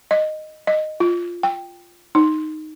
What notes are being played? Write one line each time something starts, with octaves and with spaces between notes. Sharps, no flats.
D#5
D#5
F4
G5
D#4